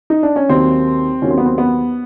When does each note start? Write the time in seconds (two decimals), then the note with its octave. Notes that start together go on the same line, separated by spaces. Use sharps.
0.10 D#4
0.23 D4
0.36 C#4
0.49 D#2 D#3 F#3 A#3 C4
1.22 D#2 D#3 F#3 A#3 C#4
1.31 C4
1.38 B3
1.46 C4
1.58 B3